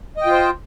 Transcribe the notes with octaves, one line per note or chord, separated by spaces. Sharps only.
F4 C5 D#5 G5